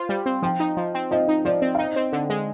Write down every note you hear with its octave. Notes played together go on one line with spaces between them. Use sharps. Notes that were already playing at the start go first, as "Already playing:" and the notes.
Already playing: F4 C5
G3
C4
F3 G5
D#4
F3
C4
F3 D#5
D#4
F3 D5
C4
F5
D#4 D#5
C4
D3
G#3